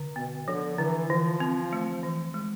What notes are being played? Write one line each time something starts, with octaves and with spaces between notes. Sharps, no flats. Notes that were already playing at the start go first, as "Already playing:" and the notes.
Already playing: D3
B2 B3
D3 F3
D3 E3
E3 F3
C4
A3
E3
G#3